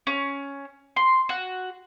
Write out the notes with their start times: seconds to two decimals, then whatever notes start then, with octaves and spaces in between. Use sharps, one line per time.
0.07 C#4
0.96 C6
1.29 F#4